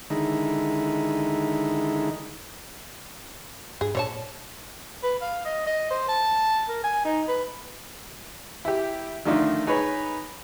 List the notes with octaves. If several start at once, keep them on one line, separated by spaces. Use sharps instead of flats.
D3 D#3 G#3 D#4 E4
G2 G#4
A#2 D3 C#5 A5
B4
F5
D#5
D#5
C5
A5
A#4
G#5
D#4
B4
E4 G4
D3 D#3 F3 A3 D4 D#4
D#4 G#4 B4 C#5 B5